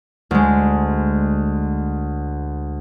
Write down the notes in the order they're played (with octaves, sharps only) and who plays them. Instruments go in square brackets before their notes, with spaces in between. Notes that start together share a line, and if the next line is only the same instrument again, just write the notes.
[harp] D2 G#3